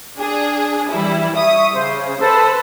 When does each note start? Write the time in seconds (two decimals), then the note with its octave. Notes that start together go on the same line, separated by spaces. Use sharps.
0.18 D4 G#4
0.90 E3 G3 E4
1.36 E5 C#6 D#6
1.73 C#3 C5
2.20 A4 B4 C5 A5 E6